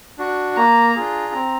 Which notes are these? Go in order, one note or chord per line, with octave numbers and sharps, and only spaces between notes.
D4 F#4
A#3 A#5
D4 F4 G#4
C4